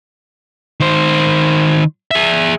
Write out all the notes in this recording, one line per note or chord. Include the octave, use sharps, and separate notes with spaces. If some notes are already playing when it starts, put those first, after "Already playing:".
D#3 C5
G#4 E5